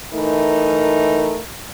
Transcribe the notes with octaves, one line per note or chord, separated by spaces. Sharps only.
E3 A3 D#4 A#4